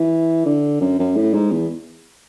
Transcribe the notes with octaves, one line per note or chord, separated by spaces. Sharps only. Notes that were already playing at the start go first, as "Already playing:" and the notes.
Already playing: E3
D3
F#2
F#2
A2
G#2
E2